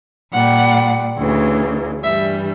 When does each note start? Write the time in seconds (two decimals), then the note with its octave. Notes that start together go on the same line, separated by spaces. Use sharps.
0.32 A#2 G3 F#5
1.17 D2 C#3 E3
2.03 G2 E3 G3 E5